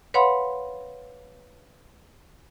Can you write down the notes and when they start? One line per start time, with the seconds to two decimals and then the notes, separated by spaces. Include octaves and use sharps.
0.14 B4 C#5 F5 F#5 B5 C6